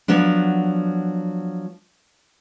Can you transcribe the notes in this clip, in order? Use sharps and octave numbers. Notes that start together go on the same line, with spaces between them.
F3 F#3 B3 D4